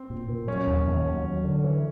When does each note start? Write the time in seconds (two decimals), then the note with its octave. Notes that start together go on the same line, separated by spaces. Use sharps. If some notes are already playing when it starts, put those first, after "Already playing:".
Already playing: C4
0.10 A#2
0.28 A#2
0.47 F#3 C#4
0.67 D#2
0.87 D#2
1.06 F#3
1.25 F#3
1.44 D3
1.64 E3